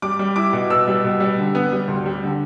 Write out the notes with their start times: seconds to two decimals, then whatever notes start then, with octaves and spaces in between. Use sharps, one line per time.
0.02 G3 D6
0.19 G3
0.36 E4 D6
0.53 B2
0.70 B2 E6
0.88 G3
1.04 B2
1.20 G3
1.38 D3
1.55 B3
1.72 G3
1.88 D2
2.06 G3
2.23 D3